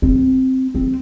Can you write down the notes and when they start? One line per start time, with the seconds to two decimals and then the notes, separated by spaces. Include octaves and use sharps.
0.02 C4
0.75 C4